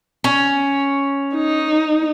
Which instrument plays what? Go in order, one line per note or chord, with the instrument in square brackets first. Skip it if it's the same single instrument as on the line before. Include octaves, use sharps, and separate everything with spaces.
[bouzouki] C#4
[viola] D#4